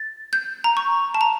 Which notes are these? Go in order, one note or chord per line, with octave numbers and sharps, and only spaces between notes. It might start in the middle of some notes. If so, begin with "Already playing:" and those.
Already playing: A6
G6
A#5
C#6
A5
A#5